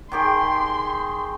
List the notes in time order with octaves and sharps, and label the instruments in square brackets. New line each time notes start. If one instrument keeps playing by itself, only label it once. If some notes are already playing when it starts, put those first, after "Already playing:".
[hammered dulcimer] D#3 G4 G#4 [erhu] C6